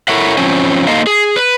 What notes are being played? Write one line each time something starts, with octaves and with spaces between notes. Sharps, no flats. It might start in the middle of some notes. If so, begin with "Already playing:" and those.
E4 A4 A#4 C#5 E5 F#5
F3 C4 C#4
A#3 D#4 A4 C5 D#5 F5
G#4
B4